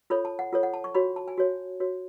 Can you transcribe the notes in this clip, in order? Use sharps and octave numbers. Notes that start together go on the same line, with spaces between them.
F4 A4 C#5 B5
A5
F#5
F4 A4 C#5
F#5
A5
C#6
F#4 C#5 B5
A5
G#5
F#4 C#5
F#4 C#5